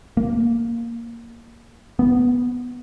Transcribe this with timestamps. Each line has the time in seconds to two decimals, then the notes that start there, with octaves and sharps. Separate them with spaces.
0.17 A#3
1.99 B3